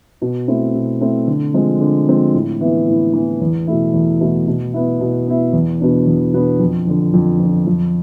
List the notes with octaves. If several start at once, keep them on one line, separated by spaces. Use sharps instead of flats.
B2
A3 C4 E4
B2
A3 C4 E4
D3
F3 G#3 C4
D3
F3 G#3 C4
A2
E3 B3 E4
A2
E3 B3 E4
E2
B2 A3 E4
E2
B2 A3 E4
B2
B3 E4
B2
B3 E4
E2
B2 B3 D4
E2
B2 B3 D4
F2
D3 F3
F2
D3 F3
F2